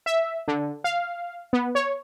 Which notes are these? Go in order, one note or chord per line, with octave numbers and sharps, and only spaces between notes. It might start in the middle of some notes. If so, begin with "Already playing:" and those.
E5
D3
F5
B3
C#5